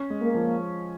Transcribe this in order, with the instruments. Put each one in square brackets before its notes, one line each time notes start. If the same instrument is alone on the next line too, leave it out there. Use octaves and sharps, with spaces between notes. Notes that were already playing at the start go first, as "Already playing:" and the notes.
Already playing: [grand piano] C#4
G#3
[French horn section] A#3
[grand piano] F3